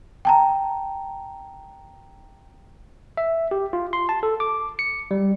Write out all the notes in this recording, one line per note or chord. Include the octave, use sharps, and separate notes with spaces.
G5 A5 A#5
E5
G4
F4
C6
A5
A4
D6
C#7
G3